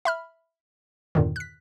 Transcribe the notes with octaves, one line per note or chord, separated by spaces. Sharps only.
E5 B5 F6
E2 G2 A#2 D3 D#3
F#6 B6